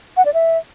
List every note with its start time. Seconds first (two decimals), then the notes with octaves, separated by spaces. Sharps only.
0.17 F#5
0.25 D5
0.34 E5